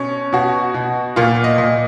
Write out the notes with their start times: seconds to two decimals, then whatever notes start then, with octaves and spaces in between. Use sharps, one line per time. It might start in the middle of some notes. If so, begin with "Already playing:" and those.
Already playing: B2 C#4
0.33 B2 F#4
0.74 B2
1.16 A#2 F4
1.44 D#5
1.58 A#2